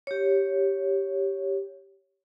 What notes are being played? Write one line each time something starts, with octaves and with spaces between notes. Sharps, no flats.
G4 C#5